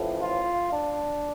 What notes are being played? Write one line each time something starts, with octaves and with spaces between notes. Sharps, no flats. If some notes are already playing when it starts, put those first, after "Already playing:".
Already playing: A1 A2 F3
F4
D4